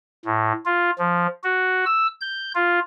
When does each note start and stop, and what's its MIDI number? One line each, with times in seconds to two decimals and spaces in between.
0.25 0.52 45
0.65 0.90 65
0.98 1.27 53
1.44 1.84 66
1.86 2.07 88
2.21 2.52 91
2.55 2.79 65